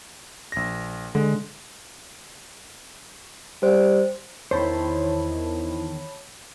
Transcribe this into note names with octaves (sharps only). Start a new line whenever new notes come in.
A#1 A#6
D3 G#3
G3 C5
E2 D#3 E4 C5 C#5 A5 B5